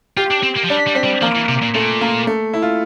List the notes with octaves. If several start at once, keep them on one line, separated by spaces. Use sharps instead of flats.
F4 G4
D4
C4
A#3
F3
G3 D4
G3
C4
G3
F3 A#3
E3
C3
A#2
A#2 A3
A#3
A3
E4
F4